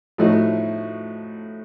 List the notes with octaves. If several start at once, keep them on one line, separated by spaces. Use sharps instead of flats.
A2 F3 A3 D#4 F#4